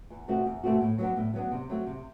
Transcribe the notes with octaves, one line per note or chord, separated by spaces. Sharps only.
E2
B2 A3 C4 F#4
E2
B2 A3 C4 F#4
A2
F#3 B3 D4
A2
F#3 B3 D4
C3
F#3 A3 C4
C3